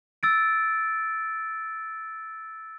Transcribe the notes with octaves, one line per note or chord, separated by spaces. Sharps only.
E6 A6 D7